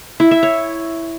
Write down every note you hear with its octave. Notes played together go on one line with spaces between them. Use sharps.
E4
E5
C#5